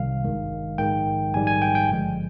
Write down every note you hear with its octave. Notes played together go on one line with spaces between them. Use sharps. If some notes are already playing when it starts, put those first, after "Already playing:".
Already playing: C2 C3 D#3 G3 F5
G#1 G2 D#3 G#3
A#1 G#2 D#3 G#3 G5
A#1 G#2 D#3 G3 G#5
G#5
G5
G5
G#1 G2 D3 F3 G#3